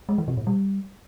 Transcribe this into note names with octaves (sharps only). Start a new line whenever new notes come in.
G#3
E3
C3
A#2
G3